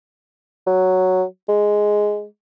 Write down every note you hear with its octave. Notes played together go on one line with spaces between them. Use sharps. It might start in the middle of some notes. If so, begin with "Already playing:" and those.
F#3
G#3